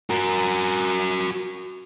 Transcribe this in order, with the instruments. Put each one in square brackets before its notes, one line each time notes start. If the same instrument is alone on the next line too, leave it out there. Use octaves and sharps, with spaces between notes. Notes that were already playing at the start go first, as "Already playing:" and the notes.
[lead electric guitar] F#4 A#4